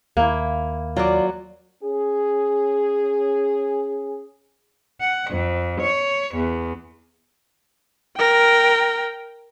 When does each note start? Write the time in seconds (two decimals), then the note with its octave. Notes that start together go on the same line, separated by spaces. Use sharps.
0.17 D#2 A#3 E4
0.97 F#3 F4 D5
1.84 C#4 G#4
5.01 F#5
5.31 F2
5.81 C#5
6.35 E2
8.17 A#4 G5